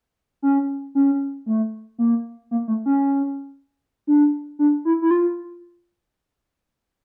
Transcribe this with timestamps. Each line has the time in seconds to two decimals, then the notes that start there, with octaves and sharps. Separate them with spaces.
0.42 C#4
0.95 C#4
1.46 A3
1.98 A#3
2.51 A#3
2.68 A3
2.86 C#4
4.07 D4
4.59 D4
4.85 E4
5.02 E4
5.11 F4